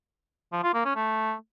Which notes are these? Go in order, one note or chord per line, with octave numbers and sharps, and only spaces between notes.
F3
F4
A#3
C#4
A3